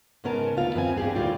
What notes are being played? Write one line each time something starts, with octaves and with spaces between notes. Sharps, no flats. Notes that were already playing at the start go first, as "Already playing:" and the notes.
G#2 C#3 B3 C#4 A#4 A5
D2 B3 F4 F5
F#2 B3 C4 G#5
G2 G4 G#4
D2 A2 G3 F4 G4